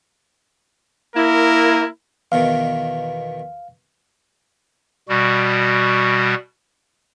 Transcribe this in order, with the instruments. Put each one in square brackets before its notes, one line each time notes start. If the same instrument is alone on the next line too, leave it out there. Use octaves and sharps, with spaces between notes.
[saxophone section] A#3 E4 [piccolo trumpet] A#4
[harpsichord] E2 B2 D#3 [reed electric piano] F5
[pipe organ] B2 G3 F#4